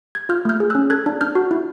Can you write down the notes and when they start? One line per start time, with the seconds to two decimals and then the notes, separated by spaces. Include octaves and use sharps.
0.15 G#6
0.29 F4 F6 G6
0.45 A3 F6 G6
0.60 G#4
0.70 E6 F#6
0.75 C#4
0.90 A4 F#6 G#6
1.06 D4
1.21 D4 F6 G6
1.35 F#4
1.51 E4